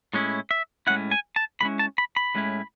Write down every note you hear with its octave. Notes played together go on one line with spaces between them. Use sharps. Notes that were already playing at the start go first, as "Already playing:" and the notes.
A2 G#3 C#4 E4
E5
A2 G#3 C#4 E4 F#5
G#5
A5
A2 G#3 C#4 E4 B5
A5
B5
B5
A2 G#3 C#4 E4